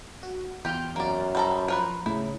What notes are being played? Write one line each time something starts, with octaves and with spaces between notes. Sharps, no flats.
F#4
E2 F4 G4 F6 G6
F#2 A#3 D5
G3 A4 C5 D#5 A#5
F3 F4 A#4 B4
A2 C#3 E4